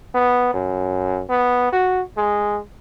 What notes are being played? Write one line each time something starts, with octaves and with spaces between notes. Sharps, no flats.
B3
F#2
B3
F#4
G#3